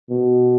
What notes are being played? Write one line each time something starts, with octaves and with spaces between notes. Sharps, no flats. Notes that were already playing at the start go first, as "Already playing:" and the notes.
B2